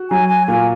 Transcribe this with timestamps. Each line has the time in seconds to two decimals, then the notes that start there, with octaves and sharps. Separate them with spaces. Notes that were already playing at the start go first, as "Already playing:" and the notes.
Already playing: F#4
0.11 F#3 G#5
0.29 G#5
0.48 A#2 G#5